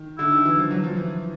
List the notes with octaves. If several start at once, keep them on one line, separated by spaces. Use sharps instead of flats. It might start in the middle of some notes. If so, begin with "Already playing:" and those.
Already playing: D#3
D3 E4
D#3
E3
F3
F#3
F3
E3